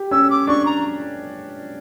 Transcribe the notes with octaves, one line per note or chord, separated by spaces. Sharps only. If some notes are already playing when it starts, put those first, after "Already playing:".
Already playing: G4
C#4 E6
D6
D4 C#6
A#5